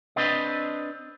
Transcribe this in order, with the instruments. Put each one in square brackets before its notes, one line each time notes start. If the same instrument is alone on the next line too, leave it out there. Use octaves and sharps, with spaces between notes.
[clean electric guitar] C4 D4 B4 D#5